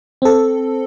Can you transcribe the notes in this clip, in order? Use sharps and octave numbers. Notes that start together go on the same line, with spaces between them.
C4 A4